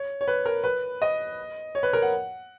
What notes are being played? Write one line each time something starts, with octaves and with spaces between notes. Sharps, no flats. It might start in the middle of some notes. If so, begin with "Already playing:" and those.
Already playing: C#5
C#5
B4
A#4
B4
D#5
C#5
B4
A#4
F#5